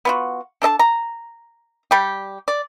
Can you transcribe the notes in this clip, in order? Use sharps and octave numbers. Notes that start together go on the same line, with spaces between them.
B3 F4 F#4
D4 A4 D#5 A5
A#5
G3 G4
D5